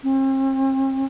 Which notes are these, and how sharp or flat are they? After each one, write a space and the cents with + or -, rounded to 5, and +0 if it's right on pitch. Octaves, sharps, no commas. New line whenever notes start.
C4 +40